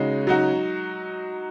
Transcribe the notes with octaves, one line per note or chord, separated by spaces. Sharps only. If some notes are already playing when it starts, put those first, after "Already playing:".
Already playing: C#3 G#3 D#4 F#4
F#3 D#4 F#4